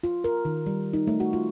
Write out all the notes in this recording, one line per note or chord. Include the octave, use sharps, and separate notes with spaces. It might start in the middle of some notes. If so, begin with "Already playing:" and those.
F4
A#4
D#3
G3
D#4
A3
F#4
F4